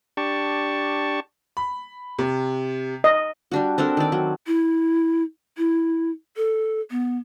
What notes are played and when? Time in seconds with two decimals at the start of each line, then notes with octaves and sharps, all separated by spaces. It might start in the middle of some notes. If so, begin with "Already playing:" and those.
0.17 D4 G4 A5 C#6
1.57 B5
2.19 C3
3.04 D#5
3.51 G3 D4 F#4
3.78 C4 D4 A4 A#4
3.97 D#3 D5
4.12 F#3
4.47 E4
5.58 E4
6.37 A4
6.91 B3